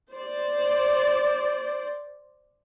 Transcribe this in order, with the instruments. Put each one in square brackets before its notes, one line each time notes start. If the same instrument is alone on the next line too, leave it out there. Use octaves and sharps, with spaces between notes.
[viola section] C5 D5